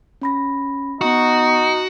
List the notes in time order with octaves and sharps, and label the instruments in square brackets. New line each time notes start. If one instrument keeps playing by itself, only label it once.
[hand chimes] C#4 B5 A#6
[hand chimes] B3 C#6 [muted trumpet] D#4 [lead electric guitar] F#4